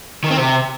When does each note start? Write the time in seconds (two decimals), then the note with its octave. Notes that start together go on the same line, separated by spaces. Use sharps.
0.24 D#3
0.31 C4
0.38 C3